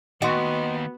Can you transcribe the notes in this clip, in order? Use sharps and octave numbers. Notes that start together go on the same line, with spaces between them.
D#2 B3 F#4 D#5 C6